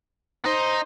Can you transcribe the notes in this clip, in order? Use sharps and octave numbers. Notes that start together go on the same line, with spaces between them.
D#4 C5